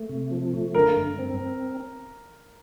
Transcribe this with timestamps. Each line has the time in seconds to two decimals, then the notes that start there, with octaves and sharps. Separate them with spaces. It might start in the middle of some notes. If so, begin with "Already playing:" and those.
Already playing: A3
0.09 C3
0.31 F3
0.53 A3
0.74 D3 A#4
0.96 G2
1.19 C4
1.40 C4